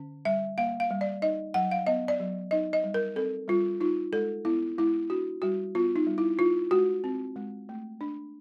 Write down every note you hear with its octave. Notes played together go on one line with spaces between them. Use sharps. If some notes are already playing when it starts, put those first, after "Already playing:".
Already playing: D3 C#4
G3 E5
A#3 F5
F5
G3
D5
D#4 D#5
F#3 F#5
F5
B3 D#5
D5
F#3
D#4 D#5
D#5
G3
A#4
C4 A4
G3 F4
D#4 F4
G#3 A4
B3 E4
G#3 E4
D4 F#4
G3 F#4
B3 F4
D#4
G3
E4
D#4 F4
G#3 F#4
C4
G#3
A3
D4